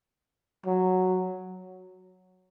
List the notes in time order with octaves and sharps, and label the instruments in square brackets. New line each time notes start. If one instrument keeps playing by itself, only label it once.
[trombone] F#3